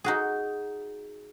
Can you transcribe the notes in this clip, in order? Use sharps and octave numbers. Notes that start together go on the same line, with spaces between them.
D#4 F#4 G#4